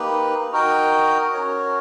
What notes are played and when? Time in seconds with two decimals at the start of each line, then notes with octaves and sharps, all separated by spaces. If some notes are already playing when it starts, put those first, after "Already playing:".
Already playing: A#3 D#4 G4 B4
0.51 D#4 F#4 A#4 D#5 G5
1.34 C#4 F#4 A#4 C#5